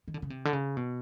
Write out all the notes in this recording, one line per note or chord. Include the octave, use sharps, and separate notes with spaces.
D#3
D3
C#3
C3
D3
C#3
B2